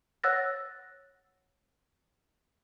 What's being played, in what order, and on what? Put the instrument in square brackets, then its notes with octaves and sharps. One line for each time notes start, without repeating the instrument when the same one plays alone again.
[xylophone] C#5 F#5 E6 F#6 A6 A#6